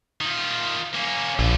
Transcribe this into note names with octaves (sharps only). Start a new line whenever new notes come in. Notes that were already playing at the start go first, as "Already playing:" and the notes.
D#3 F4
A#3 C#4
A#1 D3 F4